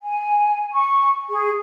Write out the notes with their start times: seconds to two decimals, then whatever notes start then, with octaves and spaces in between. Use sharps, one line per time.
0.01 G#5
0.72 C#6
1.29 G#4